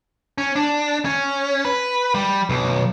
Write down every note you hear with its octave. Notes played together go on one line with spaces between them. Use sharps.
C#4
D4
C#4
B4
G3
B1